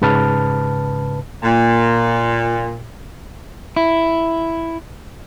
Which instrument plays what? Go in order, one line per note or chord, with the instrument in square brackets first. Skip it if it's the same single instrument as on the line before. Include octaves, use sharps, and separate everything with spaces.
[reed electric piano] G#2 C#3 B4 A5 F6
[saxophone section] A#2
[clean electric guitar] E4